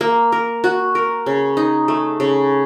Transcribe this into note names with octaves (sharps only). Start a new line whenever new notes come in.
A#3
A#4
F#4
A#4
C#3
D#4
A3
C#3